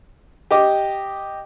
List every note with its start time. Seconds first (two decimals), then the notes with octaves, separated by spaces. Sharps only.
0.51 G4 D#5 D6